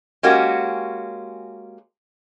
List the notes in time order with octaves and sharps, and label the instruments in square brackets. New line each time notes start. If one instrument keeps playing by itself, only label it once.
[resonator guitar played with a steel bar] G#3 A#3 C#4 F#4 G4